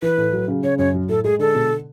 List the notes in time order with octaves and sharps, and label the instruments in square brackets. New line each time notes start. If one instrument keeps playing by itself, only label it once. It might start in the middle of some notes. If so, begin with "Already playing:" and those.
[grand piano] E3 [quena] B4
[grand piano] A2
F#3
C#3
[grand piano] C#3 [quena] C#5
[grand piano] F#2 [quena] C#5
[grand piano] F#3
[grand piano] A2 [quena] A4
[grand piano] G#3 [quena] G#4
[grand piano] D3 [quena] A4
[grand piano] B2